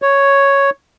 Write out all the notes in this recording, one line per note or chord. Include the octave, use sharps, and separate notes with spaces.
C#5